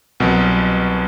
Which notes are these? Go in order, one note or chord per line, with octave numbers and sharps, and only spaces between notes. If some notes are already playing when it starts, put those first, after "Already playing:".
C2 B2 F#3